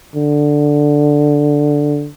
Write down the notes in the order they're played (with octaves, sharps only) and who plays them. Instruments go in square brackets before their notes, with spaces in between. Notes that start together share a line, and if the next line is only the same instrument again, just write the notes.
[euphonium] D3